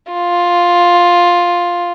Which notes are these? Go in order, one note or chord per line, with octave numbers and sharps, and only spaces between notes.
F4